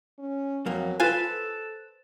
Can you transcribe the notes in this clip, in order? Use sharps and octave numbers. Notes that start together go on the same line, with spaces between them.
C#4
F2 F#3 A#3
F4 A4 B4 C5 G#5 F#6 A6 E7